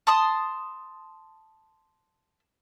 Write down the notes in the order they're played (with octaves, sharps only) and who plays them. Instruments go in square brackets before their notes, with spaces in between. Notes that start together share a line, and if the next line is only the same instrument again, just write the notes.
[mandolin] A5 C6 D#6